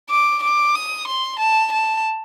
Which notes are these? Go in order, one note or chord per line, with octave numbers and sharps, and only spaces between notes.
D6
D6
D#6
C6
A5
A5